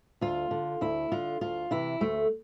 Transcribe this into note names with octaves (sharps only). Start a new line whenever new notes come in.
D2 F4
D3
D2 E4
D3 F4
D2 F4
C3 E3 E4
D2 A3